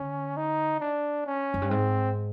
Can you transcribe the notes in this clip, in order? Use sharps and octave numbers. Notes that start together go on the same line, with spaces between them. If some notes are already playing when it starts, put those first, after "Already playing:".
Already playing: D3 C#4
D#4
D4
C#4
F#2
G2
G#2 C4